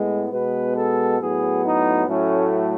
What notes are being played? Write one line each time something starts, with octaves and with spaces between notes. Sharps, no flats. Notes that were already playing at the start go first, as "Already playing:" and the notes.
Already playing: A2 G#3 B3
B2 G#3 B3 B4
A4
A2 F#3 B3 G#4
D#4
A2 F#3 A3 C#4